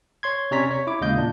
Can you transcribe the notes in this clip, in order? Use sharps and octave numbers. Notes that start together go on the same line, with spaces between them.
C#5 C6 G#6
C3 C#4 C#5 D5 A#5 B6
C#5
E4 D6
D#2 C#3 G#3 D#5 F5 G6
A#2 D4